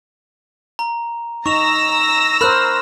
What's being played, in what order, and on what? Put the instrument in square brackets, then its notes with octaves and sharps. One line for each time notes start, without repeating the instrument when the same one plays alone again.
[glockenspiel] A#5
[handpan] D#4 [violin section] A#5 E6 A#6 [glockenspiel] C#6 F7
[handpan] A#4 C5 [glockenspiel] B5 F6 F#6